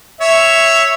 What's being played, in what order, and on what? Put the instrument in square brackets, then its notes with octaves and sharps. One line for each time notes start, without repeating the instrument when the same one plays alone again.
[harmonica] C#5 E5